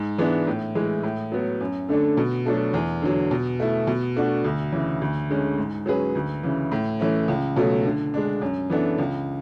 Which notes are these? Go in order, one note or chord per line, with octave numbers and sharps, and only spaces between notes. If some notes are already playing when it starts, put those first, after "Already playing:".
Already playing: G#2
E3 G#3 B3 D4
A2
E3 G#3
A2
F#3 B3
F#2
D3 A3 D4 A4
B2
F#3 A3 D4 A4
E2
D3 F#3
B2
A3 E4
B2
A3 D4 F#4
D2
C#3 E3
D2
D3 G#3 C#4
G#2
F#3 C#4 G#4 B4
D2
C#3 E3
A2
E3 A3 C#4
C#2
B2 F#3 A3
D3
G#3 D4
F#2
E3 B3 D4 A4
C#2